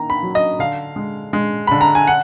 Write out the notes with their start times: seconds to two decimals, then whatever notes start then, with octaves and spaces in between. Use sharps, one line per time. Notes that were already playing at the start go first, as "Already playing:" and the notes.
Already playing: D#3 A#3 A#5
0.10 B5
0.23 F#3
0.35 D#5
0.59 D3 F5
0.96 G#3
1.33 G#3
1.67 D3 B5
1.81 A#5
1.95 G#5
2.07 F#5